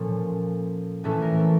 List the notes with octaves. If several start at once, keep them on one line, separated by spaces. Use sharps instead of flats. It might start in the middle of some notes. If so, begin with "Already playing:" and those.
Already playing: A#2 F3 A#3 C#4 A4
A2 E3 A3 C#4 A4
A#4
A4